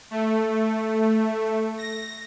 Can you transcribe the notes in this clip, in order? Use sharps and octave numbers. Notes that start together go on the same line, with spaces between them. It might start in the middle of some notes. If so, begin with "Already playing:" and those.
A3
A#6